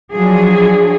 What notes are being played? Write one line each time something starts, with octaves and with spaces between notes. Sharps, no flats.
F3 F#3 D4 G#4